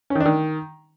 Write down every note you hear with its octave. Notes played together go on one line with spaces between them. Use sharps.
C#4
D#3
D4
D#3